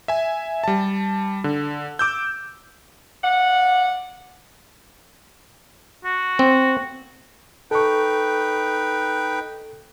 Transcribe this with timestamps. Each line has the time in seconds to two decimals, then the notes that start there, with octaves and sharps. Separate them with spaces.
0.08 E5 G#5
0.64 G3 A5
1.44 D3
1.99 D6 E6 G6
3.24 D5 F5 F#5
6.05 F#4
6.39 C4
7.71 D#4 A4 B4 G5 C#6